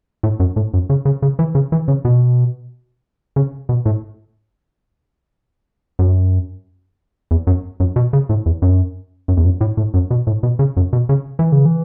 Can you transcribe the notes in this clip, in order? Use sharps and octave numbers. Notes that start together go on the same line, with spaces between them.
A2
F#2
A2
F#2
C#3
C#3
C#3
E3
C#3
E3
C#3
B2
C#3
B2
A2
F#2
E2
F#2
F#2
B2
C#3
A2
E2
F#2
F#2
E2
F#2
A2
A2
F#2
B2
A2
B2
C#3
F#2
B2
C#3
E3
C#3
E3